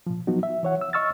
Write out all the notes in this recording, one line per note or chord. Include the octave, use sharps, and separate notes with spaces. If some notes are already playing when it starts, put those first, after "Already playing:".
A#2 F3
F3 F#3 B3 D#4 F#4
E5
E3 C#5 F#5
E6
D#5 C#6 E6 F6 A6